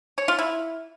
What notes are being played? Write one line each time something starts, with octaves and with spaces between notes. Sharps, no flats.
C#5
F4
E4